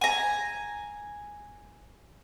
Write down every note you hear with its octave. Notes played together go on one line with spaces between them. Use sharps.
G#5 A#5